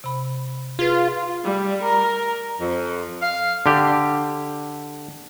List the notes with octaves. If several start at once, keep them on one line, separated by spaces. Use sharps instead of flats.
C3 B5
F4 G#4 B4
G3
A#4
F2
F5
D3 G4